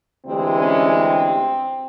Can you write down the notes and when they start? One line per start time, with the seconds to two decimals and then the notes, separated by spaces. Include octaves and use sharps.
0.24 D2 C3 E3 G#3 C4
0.59 C#4
0.92 C4